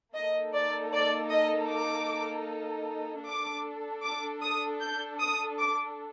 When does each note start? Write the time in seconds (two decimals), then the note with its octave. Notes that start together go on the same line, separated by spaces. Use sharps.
0.15 A#3 D#4 A4 D#5
0.53 D5
0.93 D5
1.32 D#5
1.71 D6
3.26 D4 A4 D6
4.05 D6
4.43 D#6
4.81 G6
5.20 D#6
5.59 D6